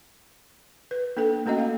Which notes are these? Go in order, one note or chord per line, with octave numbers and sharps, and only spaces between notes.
B4
A#3 D4 A4 G5
A3 A#3 C#4 F#4 D#5
F5